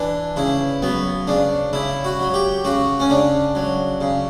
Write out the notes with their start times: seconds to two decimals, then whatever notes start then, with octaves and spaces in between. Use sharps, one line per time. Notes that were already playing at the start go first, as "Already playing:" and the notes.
Already playing: E3 D4
0.36 C#3 E4
0.82 F#3 B3
1.27 C#3 D4
1.73 C#3 E4
2.05 F#4
2.20 F#3
2.34 G4
2.64 C#3 F#4
3.00 C#4
3.10 C#3 D4
3.55 F#3
4.01 C#3